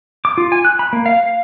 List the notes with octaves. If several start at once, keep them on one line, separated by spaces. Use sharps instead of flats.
D6
F4
G#5
F#6
B5
A#3
F5
F5